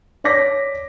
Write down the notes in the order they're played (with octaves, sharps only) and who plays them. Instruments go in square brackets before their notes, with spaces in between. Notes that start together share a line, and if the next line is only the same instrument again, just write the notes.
[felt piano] C#5 D5 D6 A#6 B6